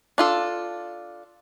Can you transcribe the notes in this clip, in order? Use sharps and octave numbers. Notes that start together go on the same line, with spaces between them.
D4 F4 A4